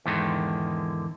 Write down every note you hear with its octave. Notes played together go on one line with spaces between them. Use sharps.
E2 G#2 D3 D#3 G#3